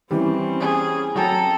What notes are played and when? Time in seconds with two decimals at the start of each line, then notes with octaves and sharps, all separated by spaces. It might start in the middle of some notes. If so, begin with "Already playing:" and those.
0.11 E3 G3 C4 C#4
0.60 G#4
1.15 F#3 A4 G5 A#5